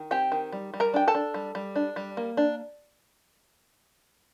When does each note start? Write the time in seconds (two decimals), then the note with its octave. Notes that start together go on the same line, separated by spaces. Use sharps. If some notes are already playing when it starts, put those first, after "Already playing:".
Already playing: D#3
0.11 C4 G4 G5
0.32 D#3
0.52 G3
0.74 G3
0.80 A#4 A#5
0.94 D4 G5
1.08 A4 A5
1.15 D4
1.34 G3
1.55 G3
1.76 D4
1.96 G3
2.17 A#3
2.37 D4